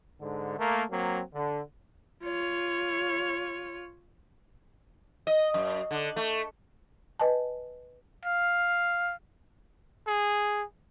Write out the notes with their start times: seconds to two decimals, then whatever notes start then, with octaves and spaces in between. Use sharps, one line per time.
0.20 G#2 D3
0.59 A3 A#3
0.90 F#3 A#3 C4
1.33 D3
2.23 F4 C#5
5.27 D#5
5.54 F#2
5.91 D3
6.16 A3
7.19 B4 D#5 G#5 A5
8.25 F5
10.07 G#4